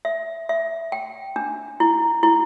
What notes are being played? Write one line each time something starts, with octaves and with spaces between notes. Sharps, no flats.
E5
E5
G5
D4
E4
E4